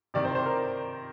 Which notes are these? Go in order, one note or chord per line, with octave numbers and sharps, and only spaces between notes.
C3 D#3 D5
C5
C5
A#4